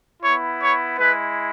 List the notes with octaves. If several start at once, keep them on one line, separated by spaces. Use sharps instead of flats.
B3 E4 C#5
C#5
G#3 E4 B4